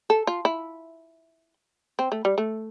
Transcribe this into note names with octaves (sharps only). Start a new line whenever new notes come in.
A4
F4
E4
C4
A3
G3
A3